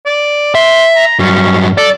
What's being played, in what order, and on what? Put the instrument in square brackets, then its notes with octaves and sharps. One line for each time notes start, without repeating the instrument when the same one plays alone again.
[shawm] D5
[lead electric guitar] E5 [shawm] C6
[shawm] A#5
[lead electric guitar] G2 F#3 [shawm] C#4
[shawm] A4 [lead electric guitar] D5